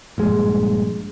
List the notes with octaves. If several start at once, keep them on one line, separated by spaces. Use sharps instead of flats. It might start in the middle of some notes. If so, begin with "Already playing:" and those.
A#1 G2 G#3